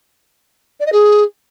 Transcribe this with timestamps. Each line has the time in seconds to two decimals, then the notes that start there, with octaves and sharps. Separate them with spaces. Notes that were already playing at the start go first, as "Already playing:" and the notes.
0.80 D5
0.86 D#5
0.92 G#4